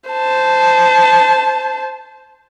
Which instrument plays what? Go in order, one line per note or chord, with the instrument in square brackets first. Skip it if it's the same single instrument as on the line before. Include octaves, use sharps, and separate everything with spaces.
[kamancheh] C5 A5